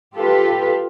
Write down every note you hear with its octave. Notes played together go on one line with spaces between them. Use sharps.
F4 G4 A4 B4